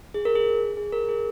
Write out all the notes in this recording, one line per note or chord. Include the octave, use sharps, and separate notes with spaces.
G#4
A#4
G#4
G#4
A#4
G#4